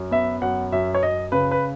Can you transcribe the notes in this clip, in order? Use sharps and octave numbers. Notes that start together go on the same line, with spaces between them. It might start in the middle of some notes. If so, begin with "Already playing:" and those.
Already playing: F#2
B3 E5
F#2 F#5
F#2 E5
C#5
F#2 D#5
C#3 B4
B4